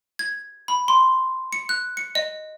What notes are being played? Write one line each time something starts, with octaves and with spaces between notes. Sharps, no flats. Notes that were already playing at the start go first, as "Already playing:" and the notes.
G#6
B5
C6
C#7
F#6
C#7
D#5